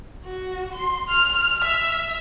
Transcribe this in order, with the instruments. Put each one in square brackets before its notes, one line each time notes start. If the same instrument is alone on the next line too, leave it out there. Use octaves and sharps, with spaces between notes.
[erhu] F#4
C6
F6
E5